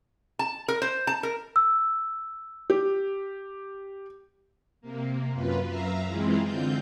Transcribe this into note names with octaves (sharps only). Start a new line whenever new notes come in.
A5
A#4
C5
A5
A#4
E6
G4
C3 A#3
F#2 F4 B4
F#2 E5 F5 A#5
E3 G#3 C4 E4 F4
D3 C4 F4 G6